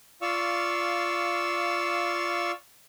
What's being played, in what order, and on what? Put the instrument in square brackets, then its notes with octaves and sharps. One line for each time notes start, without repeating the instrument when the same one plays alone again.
[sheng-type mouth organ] F4 D5 F5 C#6 E6